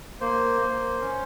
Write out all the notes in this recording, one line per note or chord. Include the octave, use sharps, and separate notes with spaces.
A#3 C5
A#3
C#4